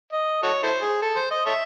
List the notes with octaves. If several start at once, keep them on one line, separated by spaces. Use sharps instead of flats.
D#5
F#4 A4 C#5
E4 A4 C5
G#4
A4
C5
D#5
A4 C#5 E5